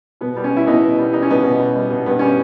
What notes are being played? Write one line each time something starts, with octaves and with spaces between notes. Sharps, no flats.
B2 B3
G3
C#4
G3
E4
B2 B3 D#4
B2
G3
G3 D#4
C#4
B2 B3 D#4
B2
G3
G3
B2
G2 B3
G3 C#4